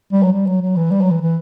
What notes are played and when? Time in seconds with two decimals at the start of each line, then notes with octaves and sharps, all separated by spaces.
0.12 G3
0.23 F#3
0.32 G3
0.47 F#3
0.62 F#3
0.76 E3
0.91 G3
1.01 F#3
1.11 E3
1.21 E3